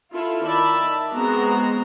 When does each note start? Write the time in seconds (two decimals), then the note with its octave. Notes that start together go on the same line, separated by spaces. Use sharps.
0.11 E4 F4 A4
0.44 D#3 D5 E5 A5 B5
1.11 G#3 B3 C4 F#4 A#5